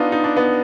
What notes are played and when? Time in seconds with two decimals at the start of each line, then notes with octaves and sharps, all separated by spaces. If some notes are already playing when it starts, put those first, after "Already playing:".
Already playing: B3 D4 D#4 F4
0.12 D#4
0.24 D4
0.37 B3